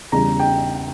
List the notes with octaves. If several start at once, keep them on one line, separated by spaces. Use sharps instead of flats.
E2 C#3 G3 A#5
G5